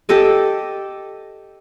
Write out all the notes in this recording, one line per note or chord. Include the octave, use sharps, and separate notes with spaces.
G4 A4 D#5 A5